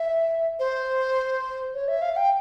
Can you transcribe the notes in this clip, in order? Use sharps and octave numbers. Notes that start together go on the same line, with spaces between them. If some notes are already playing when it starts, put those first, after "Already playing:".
Already playing: E5
C5
C#5
E5
F5
G5